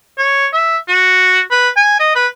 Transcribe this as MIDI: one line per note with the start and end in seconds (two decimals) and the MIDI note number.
0.18 0.47 73
0.53 0.78 76
0.88 1.40 66
1.51 1.69 71
1.76 1.99 80
2.00 2.15 75
2.15 2.27 71